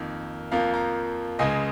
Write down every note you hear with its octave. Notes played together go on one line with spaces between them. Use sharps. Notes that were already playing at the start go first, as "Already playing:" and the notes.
Already playing: F2 D#3 A#3
F2 F3 A#3 F5 A#5
F5 A#5
C#2 C#3 G#3 D#5 G#5